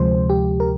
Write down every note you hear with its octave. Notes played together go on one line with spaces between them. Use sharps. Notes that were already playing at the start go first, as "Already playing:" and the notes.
Already playing: D2 C3 F3 G#3 C5
G4
A#4